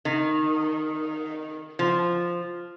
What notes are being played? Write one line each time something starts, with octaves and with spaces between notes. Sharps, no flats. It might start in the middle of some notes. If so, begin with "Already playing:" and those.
D#3
F3